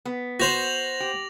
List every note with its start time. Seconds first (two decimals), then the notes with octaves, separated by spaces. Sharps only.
0.05 B3
0.40 F#4 C5 A#6 F7 F#7
1.00 G4